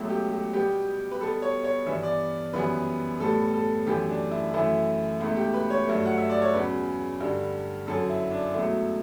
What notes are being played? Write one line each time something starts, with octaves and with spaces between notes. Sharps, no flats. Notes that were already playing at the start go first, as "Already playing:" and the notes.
Already playing: C#2 B2 F#3 A3
G4
G4
B2 G3 B3 G4
B4
B2 G3 B3 A4
C#5
C#5
G2 E3 B3 E5
D5
F#2 E3 G3 B3 B4
A2 G3 B3 A4
A4
F#2 E3 A3 G4
D4
E4
F#2 E3 A3 E4
C#2 B2 A3 E4
G4
B4
C#5
G2 F#3 A3
F#5
E5
D5
C#5
E2 C#3 F#3 B4
G2 D3 G3
F#2 D3 F#3 A4
E4
D4
C#2 B2 F#3 A3 E4